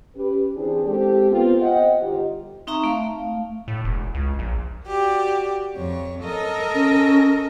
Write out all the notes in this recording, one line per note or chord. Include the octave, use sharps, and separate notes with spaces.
C#4 G4 B4
E3 C4 D4 G#4
G#3 C4 G4 A4
B3 C4 F4 G4
C5 D#5 F#5 G5
G1 D#4 F4 G4
C4 D#4 E5 A#5 C#6
A3 F5
A2
E1
C#2
A#1
F#4 G4 D5
F2 C#5
A4 A#4 D#5
C#4